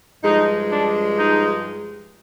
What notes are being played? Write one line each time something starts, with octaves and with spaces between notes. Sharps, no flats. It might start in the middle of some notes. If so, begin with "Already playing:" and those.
G2 F3 G#3 D#4
D4
D#4